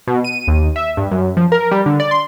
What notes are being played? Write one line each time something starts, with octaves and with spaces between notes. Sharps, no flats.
B2
D#7
D#2
E5
G2
F#2
F3
A#4
G3
D3
D5
C6